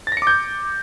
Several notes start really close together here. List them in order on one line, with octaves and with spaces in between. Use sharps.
A6 A#6 C#7 D6 G6